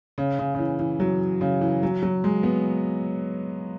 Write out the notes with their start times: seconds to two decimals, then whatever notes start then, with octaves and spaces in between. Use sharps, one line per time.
0.18 C#3
0.39 C#3
0.54 C#3
0.59 E3
0.79 E3
1.00 F#3
1.41 C#3
1.61 E3
1.83 F#3
2.02 F#3
2.24 G#3
2.43 B3